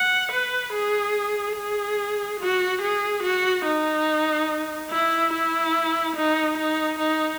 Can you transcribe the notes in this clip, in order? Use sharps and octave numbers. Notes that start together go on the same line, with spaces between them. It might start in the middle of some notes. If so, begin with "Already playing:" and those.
Already playing: F#5
B4
G#4
G#4
F#4
G#4
F#4
D#4
E4
E4
D#4
D#4
D#4